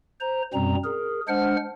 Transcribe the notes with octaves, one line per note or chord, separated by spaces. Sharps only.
C5 A#5
F#2 B2 G3 C4 A#5
G#4 A#4
G#3 D4 C5 F#5 F6